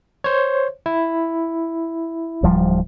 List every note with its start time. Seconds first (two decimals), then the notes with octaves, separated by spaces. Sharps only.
0.24 C5 C#5
0.86 E4
2.43 D1 F3 G3